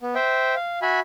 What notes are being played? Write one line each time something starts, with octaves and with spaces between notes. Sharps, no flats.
B3
C5 E5 G5
F5
F#4 E5 G#5 B5